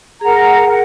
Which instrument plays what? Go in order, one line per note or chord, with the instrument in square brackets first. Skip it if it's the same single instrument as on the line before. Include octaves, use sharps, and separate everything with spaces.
[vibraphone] G#4 [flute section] A#4 F#5 A#5
[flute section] A#4 F#5